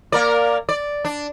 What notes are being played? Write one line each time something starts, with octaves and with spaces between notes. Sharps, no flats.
A#3 A#4 D5
D5
D4